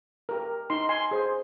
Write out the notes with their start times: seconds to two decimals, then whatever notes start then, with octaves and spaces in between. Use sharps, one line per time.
0.29 G4 A#4
0.70 D#4 C6
0.89 G#5 C6
1.11 G#4 C5